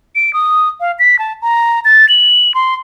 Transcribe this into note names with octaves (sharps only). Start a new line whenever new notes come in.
D7
D#6
F5
B6
A5
A#5
A6
F#7
C6